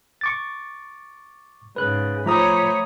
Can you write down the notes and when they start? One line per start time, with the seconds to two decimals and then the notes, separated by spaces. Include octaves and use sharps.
0.21 C#6 D6 A6
1.76 G#2 C#3 B4 F#6
2.26 F3 A3 C5 C#5 A#5 B5 D#6